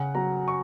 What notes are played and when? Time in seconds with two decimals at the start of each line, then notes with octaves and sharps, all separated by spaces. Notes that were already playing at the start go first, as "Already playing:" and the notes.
Already playing: C#3 F#5
0.15 F#3 A#5
0.48 C#6